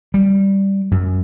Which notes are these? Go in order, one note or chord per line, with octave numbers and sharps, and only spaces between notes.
G3
F#2